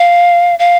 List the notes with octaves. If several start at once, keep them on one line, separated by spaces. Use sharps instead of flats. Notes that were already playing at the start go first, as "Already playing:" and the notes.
Already playing: F5
F5